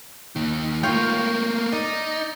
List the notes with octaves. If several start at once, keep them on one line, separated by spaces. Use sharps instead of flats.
D#2 D#3
A3 A#3 F4 C#5 G5
D#4 D5